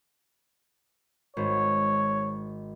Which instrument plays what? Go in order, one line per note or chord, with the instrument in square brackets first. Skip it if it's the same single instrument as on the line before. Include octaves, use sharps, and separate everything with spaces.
[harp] G#1 [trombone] C#5